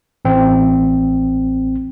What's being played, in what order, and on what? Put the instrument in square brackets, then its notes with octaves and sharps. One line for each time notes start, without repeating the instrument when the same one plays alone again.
[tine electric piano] A1 C4